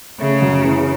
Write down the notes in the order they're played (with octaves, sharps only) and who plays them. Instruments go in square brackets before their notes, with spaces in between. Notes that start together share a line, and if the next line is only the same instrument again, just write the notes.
[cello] C#3 [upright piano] A3
[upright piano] F#2
E3